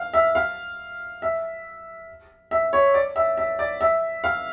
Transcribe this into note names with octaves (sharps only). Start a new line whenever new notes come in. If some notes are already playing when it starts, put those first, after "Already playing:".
Already playing: F5
E5
F5
E5
E5
C#5
D5
E5
E5
D5
E5
F5